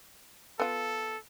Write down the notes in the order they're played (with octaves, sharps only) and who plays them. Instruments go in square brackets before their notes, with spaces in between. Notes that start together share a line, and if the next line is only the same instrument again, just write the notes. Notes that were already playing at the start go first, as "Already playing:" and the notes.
[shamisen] B3 F4 [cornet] A4